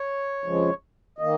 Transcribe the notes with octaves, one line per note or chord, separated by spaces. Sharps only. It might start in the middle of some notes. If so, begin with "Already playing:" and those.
Already playing: C#5
F2 C#3 F3 G#3
D#3 A#3 D#5